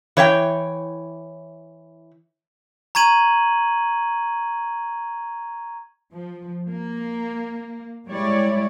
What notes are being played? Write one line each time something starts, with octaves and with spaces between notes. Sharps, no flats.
E3 C#5 E5 G5
A#5 C#6 G#6 D#7 F#7
F3
A#3
G3 G#3 E4 C#5 D5